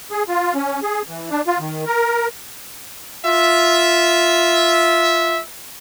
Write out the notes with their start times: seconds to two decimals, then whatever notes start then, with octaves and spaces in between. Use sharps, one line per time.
0.11 G#4
0.28 F4
0.55 C#4
0.83 G#4
1.08 E3
1.30 D4
1.47 F4
1.59 D#3
1.86 A#4
3.26 F4 E5